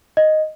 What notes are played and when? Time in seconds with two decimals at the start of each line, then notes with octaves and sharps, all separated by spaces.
0.17 D#5